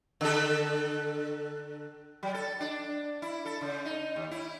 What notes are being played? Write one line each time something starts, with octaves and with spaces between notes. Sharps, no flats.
D3 A4
F#3
A4
D4
E4
A4
C#3
D#4
D#2
E4